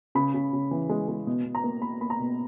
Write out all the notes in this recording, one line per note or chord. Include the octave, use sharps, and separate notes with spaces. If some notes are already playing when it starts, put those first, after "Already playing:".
C#3 B5
C#3
C#3
E3
G#3
G#3
B2
B2
A#5
A#3
A#3 B5
A#3 B5
A#5
B2